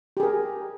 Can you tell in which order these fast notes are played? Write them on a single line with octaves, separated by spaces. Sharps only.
G4 G#4 A#4